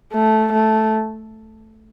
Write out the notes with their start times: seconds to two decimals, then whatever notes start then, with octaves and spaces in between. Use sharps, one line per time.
0.13 A3
0.52 A3